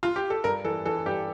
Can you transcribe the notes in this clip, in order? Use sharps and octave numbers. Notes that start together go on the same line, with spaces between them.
F4
G4
A4
G2 A#4
E3 A4
E3 A4
G2 G4